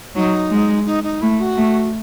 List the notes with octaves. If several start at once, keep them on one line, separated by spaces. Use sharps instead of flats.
F#3 D#4
G#3
D#4
D#4
A3 E4
F#4
A3